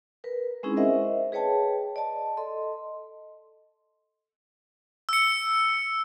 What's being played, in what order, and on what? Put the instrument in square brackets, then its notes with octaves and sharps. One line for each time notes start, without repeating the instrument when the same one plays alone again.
[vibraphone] A#4 B4
G#3 C4 C#4 D#4 E4 G#4
A#4 C5 D#5 E5 F#5
G#4 B4 C#5 G5 A5
D5 D#5 A5
A4 D#5 C6
[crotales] E6 C#7